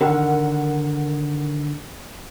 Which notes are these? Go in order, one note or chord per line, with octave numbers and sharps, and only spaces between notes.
D3 D#3 A#4 F#5